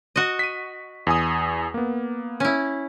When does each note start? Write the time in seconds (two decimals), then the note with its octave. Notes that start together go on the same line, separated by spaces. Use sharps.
0.16 F#4 D#5
0.39 B6 D#7
1.07 E2 G#5 D#6
1.74 A#3 B3
2.40 C#4 E4